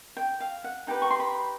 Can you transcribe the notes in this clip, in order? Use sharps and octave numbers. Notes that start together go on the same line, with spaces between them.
G5
F5
F#5
D#4 G4 B4 G5
C#6
C6
B5